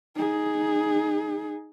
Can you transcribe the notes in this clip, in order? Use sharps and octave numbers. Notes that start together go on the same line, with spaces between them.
D#4 G#4